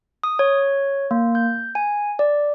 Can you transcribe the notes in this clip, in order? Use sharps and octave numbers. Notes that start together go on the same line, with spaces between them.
D#6
C#5
A#3
G6
G#5
D5